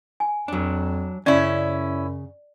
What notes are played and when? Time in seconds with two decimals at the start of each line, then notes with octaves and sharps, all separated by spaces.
0.20 G#5
0.48 F2 F#3 D4
1.26 F#2 C#3 C#4 E4 D5